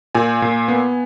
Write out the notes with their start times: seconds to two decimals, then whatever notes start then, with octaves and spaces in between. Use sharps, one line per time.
0.15 A#2 G#5
0.42 A#2
0.68 B3